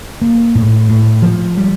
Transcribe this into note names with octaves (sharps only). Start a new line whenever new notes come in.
A#3
A2
A2
F3
G3